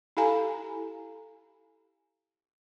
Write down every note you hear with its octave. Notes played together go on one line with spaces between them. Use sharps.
E4 G4 A4 F5 G#5 A#5